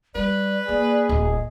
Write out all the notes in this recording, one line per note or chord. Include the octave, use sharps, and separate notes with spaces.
G3 B4 D5
A#3 G#4
D1 D#5